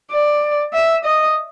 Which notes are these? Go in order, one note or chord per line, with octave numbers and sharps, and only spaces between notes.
D5
E5
D#5